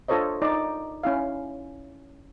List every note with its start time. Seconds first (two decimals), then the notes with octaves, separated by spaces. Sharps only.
0.08 D4 F4 A4 C5 C#5 D#5
0.42 D#4 D5
1.03 C#4 E4 F5